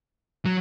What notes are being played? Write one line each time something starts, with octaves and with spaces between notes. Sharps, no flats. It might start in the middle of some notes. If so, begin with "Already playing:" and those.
F#3